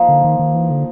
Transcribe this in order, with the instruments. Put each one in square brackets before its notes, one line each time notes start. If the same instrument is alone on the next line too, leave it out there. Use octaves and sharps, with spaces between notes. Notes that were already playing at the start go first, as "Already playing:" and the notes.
Already playing: [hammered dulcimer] F3 A#3 D#4
[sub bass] D3
D#3
D#3
E3
D3